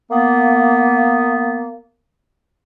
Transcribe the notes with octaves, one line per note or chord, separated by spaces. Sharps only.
A#3 B3